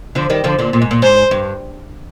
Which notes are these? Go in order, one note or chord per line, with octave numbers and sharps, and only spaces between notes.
D3 F3
D#3 G3
D3 F3
A#2 D3
A#2
G#2
A#2
G#2 C5
G2